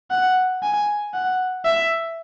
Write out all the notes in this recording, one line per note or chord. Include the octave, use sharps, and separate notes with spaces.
F#5
G#5
F#5
E5